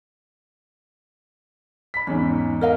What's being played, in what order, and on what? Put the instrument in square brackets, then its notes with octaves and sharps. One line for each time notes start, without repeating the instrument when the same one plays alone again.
[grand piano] B5 B6
[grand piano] E2 G#2 [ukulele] C#4
[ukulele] A#4 D#5 F5